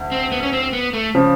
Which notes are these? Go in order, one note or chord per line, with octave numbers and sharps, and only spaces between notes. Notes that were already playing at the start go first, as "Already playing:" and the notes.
Already playing: D2
C4
B3
C#4
C4
B3
A3
C#3 F3